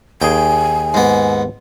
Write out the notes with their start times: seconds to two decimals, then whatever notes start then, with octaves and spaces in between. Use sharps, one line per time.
0.22 D#2 G#4 G5 G#5
0.94 G#2 B3